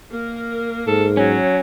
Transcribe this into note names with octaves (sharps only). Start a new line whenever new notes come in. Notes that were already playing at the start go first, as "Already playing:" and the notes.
A#3 A#4
G#2 A4
F#3 C#4